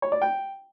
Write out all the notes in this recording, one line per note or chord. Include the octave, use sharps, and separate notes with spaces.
C#5
D5
G5